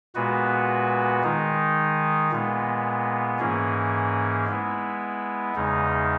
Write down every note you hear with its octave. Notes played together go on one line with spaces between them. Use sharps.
A#2 G#3 B3 F#4 B4
D#3 G#3 D#4
A#2 G#3 B3
G#2 E3 A#3 C#4 G#4
G#3 B3 E4
E2 C#3 G#3 D#4